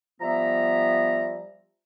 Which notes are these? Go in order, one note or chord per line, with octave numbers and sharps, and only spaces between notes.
F3 G3 B3 E5 A#5